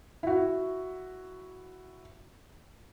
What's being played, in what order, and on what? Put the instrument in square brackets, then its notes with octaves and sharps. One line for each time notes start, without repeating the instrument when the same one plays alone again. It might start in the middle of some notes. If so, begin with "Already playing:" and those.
[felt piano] E4 F#4